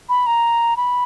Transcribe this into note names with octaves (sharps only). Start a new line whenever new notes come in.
B5
A#5
B5